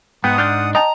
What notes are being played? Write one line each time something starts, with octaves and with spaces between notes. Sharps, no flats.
G#2 B3 F#5 G5 D#6
D4 F6 G6 A6
D#5 G5 A5 A#5